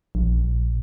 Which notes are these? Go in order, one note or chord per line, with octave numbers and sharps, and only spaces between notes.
A#1